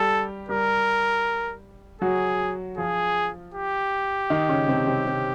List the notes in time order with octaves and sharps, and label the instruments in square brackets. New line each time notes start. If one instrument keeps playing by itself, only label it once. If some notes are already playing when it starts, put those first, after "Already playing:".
Already playing: [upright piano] G3 G4 [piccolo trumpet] A4
[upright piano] G3 G4 [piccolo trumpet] A#4
[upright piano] F#3 F#4 [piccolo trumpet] G#4
[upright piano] F3 F4 [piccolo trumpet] G#4
[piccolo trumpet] G4
[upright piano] D#3 D#4
C#3 C#4
C3 C4
C3 C4
C3 C4